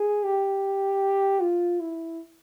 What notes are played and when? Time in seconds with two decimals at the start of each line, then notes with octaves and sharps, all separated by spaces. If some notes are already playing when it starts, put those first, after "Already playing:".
Already playing: G#4
0.24 G4
1.41 F4
1.80 E4